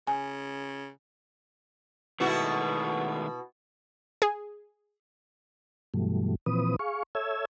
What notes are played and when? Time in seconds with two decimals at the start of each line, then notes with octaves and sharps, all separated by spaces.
0.07 C#3 G#5
2.20 B2 D#3 G#3 A3 E4 F#4
4.22 G#4
5.94 G2 B2 E3 F#3 G3 A3
6.46 A#2 E3 F3 C4 B4 D#6
6.79 G#4 F5 C#6
7.15 A4 C#5 E5 E6 G#6